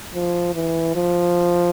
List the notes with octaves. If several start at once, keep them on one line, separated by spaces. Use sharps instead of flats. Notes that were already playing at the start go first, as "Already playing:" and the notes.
F3
E3
F3